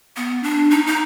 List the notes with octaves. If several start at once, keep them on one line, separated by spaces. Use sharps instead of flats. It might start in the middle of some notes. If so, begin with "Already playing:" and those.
B3
D4
D#4
D#4